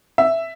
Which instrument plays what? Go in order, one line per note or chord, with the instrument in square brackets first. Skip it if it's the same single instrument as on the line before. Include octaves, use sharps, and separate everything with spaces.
[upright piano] E5